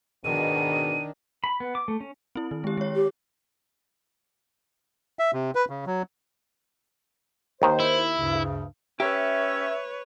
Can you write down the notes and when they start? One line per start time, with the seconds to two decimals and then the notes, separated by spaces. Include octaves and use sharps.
0.24 G#2 B2 D#3 D4 D#7
1.44 B5
1.60 B3
1.75 D6
1.88 A3
2.00 C#4
2.35 C4 E4
2.51 D#3
2.64 G#3 G4
2.77 G#3 C#5
2.95 G4
5.19 E5
5.34 C3
5.55 B4
5.69 C#3
5.86 F#3
7.62 D#2 D#3 C5
7.80 E4
8.18 D2 G2 C#3
9.00 C#4 G4 B4 C#5 E5